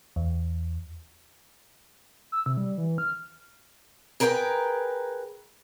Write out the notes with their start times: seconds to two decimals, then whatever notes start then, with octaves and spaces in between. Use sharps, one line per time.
0.16 E2
2.32 E6
2.46 C3
2.57 G3
2.78 E3
2.98 F6
4.20 G#4 A#4 B4 C#5 G5 A#5